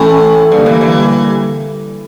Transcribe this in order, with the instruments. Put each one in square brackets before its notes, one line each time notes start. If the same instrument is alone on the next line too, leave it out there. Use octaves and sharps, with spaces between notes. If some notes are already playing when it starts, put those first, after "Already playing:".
Already playing: [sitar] A2 [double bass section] E3 A3 C#4
[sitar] G2 [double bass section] D3 G3 A#3
[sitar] E3
E3